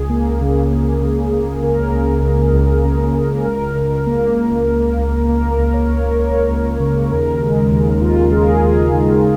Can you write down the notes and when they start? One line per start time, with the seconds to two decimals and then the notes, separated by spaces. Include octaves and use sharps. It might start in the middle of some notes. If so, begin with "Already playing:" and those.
Already playing: C#2 G#4
0.09 A#3
0.41 C#3
0.70 A#3
1.01 C#3
1.32 A#3
1.62 C#3 A#4
1.92 C#2
2.22 C#2
2.53 C#2
2.84 C#3
3.15 C#2
3.45 C#2 A#4
3.75 C#2
4.06 A#3
4.36 C#2
4.66 C#2
4.97 C#2
5.27 A#3 A#4
5.50 A#4
5.58 C#2
5.73 C#5
5.89 C#2
5.97 A#4
6.19 C#2 C#5
6.49 C#2
6.80 C#3
7.11 D#2 A#4
7.41 G#3
7.71 D#2
8.01 D#2 F4
8.32 G#3 G#4
8.40 A#4
8.48 G#4
8.62 D#2 A#4
8.92 D#3